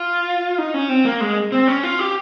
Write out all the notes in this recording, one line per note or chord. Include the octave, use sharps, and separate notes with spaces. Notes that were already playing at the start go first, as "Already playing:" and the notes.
Already playing: F4
D#4
C#4
C4
A#3
G#3
C4
C#4
F4
G4